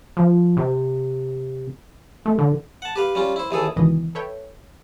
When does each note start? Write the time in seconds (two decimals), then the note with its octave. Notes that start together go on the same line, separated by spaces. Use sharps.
0.17 F3
0.57 C3
2.26 A3
2.39 D3
2.82 F#5 A5
2.96 G4 B4 F5
3.15 G3 C#4 F4
3.36 E4 C5
3.51 D#2 E3 G#4 A4
3.76 C#2 B2 D#3 E3 D#5 D#6
4.15 A4 B4 C#5 E5 G5